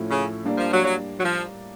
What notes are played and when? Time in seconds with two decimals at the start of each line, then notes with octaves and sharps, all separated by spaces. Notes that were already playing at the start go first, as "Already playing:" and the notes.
Already playing: A2 F3 A3 C#4 E4
0.10 C#3
0.45 G3 A#3 D4
0.58 F3
0.71 F#3
0.84 F#3
1.19 F#3
1.24 F3